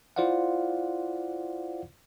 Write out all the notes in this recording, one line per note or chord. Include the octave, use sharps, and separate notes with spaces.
E4 F4 C5 D5 F5 F#5